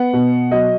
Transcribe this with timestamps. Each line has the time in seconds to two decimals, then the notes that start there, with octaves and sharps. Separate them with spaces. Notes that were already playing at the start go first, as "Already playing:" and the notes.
Already playing: B3 F#5
0.13 B2
0.51 F#3 D#5